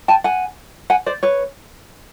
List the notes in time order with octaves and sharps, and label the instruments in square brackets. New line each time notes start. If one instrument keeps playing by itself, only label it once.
[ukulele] G5 A5
F#5 G#5
F#5 G#5
C5 D5
B4 C#5